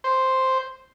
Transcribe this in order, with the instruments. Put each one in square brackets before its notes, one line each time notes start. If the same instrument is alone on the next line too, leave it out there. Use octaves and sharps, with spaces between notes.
[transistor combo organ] C5